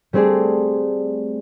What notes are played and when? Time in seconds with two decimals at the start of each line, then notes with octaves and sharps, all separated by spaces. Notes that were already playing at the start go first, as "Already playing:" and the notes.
0.13 G3 A3 C4 G#4 D5